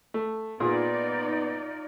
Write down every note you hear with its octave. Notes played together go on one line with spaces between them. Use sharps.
A3
A#2 B3 D#4 F4 G#4 D5 E6